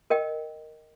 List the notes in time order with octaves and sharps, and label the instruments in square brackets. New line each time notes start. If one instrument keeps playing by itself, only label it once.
[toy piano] A#4 D#5 G5